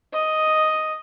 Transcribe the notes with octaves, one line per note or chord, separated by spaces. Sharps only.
D#5